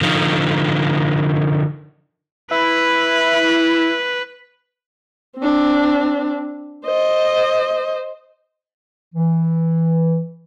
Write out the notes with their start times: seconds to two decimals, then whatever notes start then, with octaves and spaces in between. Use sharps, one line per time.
0.01 D3 F3 D#4
2.51 E4 B4
5.38 C4 D4
6.86 C5 D#5
9.14 E3